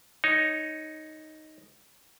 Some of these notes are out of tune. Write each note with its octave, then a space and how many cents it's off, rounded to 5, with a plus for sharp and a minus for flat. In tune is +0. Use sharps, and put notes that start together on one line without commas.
D#4 +0 C#5 +0